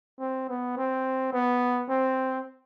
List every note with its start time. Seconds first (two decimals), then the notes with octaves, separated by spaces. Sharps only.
0.19 C4
0.49 B3
0.77 C4
1.33 B3
1.89 C4